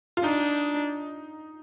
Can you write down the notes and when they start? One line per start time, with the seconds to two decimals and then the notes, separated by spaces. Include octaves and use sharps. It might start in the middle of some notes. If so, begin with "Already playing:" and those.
0.17 F4
0.24 D4 D#4